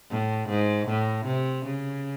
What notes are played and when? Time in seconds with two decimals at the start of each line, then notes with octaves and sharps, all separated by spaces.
0.10 A2
0.49 G#2
0.88 A2
1.26 C3
1.66 C#3